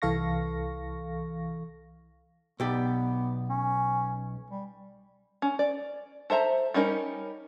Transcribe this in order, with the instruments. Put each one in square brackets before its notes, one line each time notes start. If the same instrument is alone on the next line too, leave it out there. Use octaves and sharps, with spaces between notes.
[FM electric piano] C2 E3 A4 F5 C#6 A#6
[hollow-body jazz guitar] B1 G4 D5 [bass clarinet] B3
[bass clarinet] C#4
G3
[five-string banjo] C#4
D5
A4 C5 E5 A#5
G3 C#4 D#4 A#4